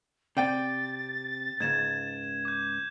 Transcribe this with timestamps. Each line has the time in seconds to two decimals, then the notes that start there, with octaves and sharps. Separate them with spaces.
0.37 C3 D5 G5 A6
1.60 C#2 G#2 G#6 E7
2.45 D6 G6